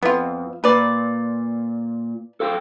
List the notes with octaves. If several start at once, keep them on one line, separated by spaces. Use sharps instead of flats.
F2 B3 F4
A#2 B4 D5
A4 F5 G5